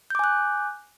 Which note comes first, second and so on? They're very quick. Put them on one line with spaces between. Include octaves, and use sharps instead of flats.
G6 D6 G#5 F#6